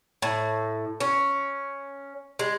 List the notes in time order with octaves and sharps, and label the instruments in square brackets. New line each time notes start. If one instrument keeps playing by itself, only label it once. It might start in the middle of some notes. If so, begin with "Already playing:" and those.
[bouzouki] A2
C#4
G#3